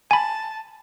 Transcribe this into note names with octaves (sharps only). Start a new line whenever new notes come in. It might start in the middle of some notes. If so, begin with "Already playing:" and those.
G#5 A5 B5